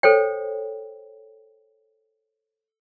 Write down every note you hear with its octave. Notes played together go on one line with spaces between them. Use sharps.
A4 C5 C#5 G5